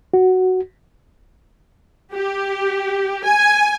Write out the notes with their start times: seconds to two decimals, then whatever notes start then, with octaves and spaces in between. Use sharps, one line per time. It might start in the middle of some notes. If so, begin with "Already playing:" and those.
0.14 F#4
2.13 G4
3.24 G#5